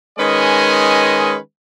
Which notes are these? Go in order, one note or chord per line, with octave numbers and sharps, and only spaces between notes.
D#3 G#3 C#4 B4 D#5 G#5